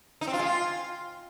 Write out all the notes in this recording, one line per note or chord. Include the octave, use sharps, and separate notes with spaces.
D#4
C4
F4
G#3
F4